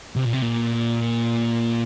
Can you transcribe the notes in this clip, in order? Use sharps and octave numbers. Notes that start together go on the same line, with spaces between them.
C3
A#2
C3
A#2